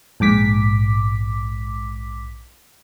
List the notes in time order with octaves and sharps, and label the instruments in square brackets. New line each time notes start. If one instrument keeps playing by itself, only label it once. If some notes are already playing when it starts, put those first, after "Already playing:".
[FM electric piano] A#1 G#2 D6 B6